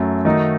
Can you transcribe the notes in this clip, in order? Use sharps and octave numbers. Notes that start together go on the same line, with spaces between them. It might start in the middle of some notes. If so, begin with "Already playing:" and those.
Already playing: F#2 F#3 A3
D#3 A3 D#4 F#4